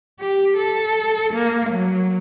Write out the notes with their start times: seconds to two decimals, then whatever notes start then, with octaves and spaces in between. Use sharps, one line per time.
0.20 G4
0.57 A4
1.34 A#3
1.70 F#3